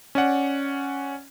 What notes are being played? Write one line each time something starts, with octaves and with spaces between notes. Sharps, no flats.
C#4 D5 F#5